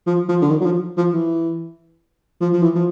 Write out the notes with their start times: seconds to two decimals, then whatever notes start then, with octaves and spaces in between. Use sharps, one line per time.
0.07 F3
0.29 F3
0.42 D3
0.50 D#3
0.61 F#3
0.65 F3
0.97 F3
1.13 E3
2.41 F3
2.53 F3
2.62 E3
2.75 F3